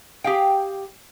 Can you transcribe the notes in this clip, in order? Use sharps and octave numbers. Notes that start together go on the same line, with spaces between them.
G4 G#4 F5 G5